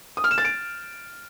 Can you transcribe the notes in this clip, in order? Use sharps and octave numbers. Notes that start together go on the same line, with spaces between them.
D#6
F6
E7
A6
D7